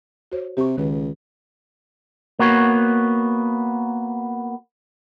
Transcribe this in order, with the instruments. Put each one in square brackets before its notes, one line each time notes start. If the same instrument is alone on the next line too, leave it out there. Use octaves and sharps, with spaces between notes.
[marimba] F#4 C5 C#5
[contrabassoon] C3 [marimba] G4 C#6
[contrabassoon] C#2 [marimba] D#3 B4
[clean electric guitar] A#3 B3 F#4 C#5